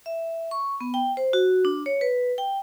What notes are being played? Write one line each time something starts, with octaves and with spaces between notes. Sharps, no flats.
E5
C#6
B3
G5
C5
F#4
D4
C#5
B4
G5